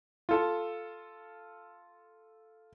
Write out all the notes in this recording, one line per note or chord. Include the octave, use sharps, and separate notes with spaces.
F4 A4